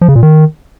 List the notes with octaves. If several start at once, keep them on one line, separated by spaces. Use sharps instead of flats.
F3
C#3
A#2
D#3